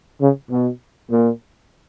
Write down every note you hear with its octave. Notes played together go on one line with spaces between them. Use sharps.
C#3
B2
A#2